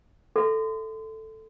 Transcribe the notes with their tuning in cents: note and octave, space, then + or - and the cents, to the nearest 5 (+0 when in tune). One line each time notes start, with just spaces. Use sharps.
A4 +0 E5 -5 C6 -35